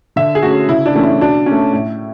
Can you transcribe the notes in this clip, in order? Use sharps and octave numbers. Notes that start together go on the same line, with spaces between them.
D3 E5
G#4
A3 C#4 F#4
C#3 E4
D4
E3 A3 C#4
E4
B2 D4
C#4
A3
A2